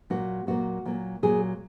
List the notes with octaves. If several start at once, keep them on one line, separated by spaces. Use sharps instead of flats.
A#2 F#3 A#3 F#4
A#2 F#3 A#3 F#4
A#2 F#3 A#3
A#2 F#3 A#3 G#4